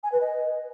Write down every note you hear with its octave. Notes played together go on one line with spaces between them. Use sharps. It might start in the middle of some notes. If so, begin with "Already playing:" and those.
G#5
B4
D#5